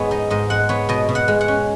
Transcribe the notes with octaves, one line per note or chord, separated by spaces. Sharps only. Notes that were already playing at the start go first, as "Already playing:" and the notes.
Already playing: G#2 G#3 B3 G#4 C#5
D#4 D#5
G#2 D#5
G#3 F#5
B3 C#5
B2 D#5
B2
F#5
G#3
F#5
C#4